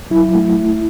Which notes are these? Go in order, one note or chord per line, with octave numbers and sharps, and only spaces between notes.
F#3 E4
A3